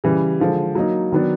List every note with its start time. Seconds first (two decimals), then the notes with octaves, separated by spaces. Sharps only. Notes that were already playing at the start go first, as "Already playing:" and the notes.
0.04 C#3 E3 G3
0.40 D3 F3 G#3
0.75 F#3 A#3 D#4
1.12 D#3 F#3 B3 D4